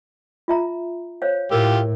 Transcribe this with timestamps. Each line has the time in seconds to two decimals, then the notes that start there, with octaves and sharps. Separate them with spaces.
0.48 F4 E5 A#5
1.22 C5 C#5 F5
1.51 A2 F4 G4 A#4